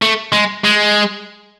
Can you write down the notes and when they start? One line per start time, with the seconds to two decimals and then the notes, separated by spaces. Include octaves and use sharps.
0.02 A3
0.33 G#3
0.64 G#3